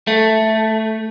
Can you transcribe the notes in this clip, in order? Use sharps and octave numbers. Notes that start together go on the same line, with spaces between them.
A3